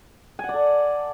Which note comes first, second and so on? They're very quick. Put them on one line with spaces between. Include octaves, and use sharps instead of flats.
G#5 F#5 D5 A4